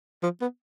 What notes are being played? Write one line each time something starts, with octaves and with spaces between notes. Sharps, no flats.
F3
B3